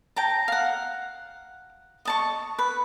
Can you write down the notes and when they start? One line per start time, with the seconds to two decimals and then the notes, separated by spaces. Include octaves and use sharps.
0.16 G5 A5 A#5
0.48 F5 F#5
2.05 D#5 A5 C#6
2.59 B4